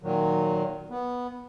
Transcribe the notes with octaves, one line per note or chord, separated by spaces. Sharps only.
A#2 D#3 F#3
B3